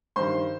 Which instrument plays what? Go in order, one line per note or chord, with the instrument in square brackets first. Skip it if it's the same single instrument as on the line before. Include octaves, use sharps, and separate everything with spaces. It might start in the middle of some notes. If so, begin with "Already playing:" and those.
[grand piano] G2 D#3 C5 C6